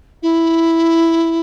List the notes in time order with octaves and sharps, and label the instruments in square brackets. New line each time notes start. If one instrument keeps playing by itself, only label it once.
[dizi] E4